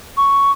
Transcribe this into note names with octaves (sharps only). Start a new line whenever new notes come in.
C#6